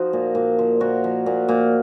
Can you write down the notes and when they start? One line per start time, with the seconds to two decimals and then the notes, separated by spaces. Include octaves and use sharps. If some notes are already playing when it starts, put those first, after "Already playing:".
Already playing: F3 D#4 F#4
0.13 A#2
0.35 A#2
0.59 F3
0.80 A#2 F#4 A#4
1.04 F3
1.26 A#2
1.48 A#2